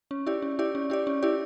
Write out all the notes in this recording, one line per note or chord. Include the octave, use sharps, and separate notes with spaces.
C#4
E4 G4 D5
C#4
E4 G4 D5
C#4
E4 G4 D5
C#4
E4 G4 D5